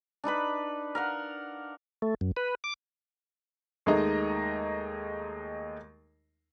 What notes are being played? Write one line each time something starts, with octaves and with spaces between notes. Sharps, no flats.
D4 D#4 B4 B5
A#4 F5 F#5
A3
F#2
B4
D6
D#2 G#3 A3 D#4 D#5 A#5